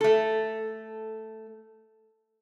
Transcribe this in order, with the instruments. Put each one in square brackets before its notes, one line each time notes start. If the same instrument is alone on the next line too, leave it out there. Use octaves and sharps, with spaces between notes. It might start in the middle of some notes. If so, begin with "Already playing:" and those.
[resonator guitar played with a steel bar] A3 A4